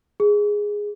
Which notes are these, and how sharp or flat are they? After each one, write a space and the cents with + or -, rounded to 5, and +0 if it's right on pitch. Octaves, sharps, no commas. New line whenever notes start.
G#4 -5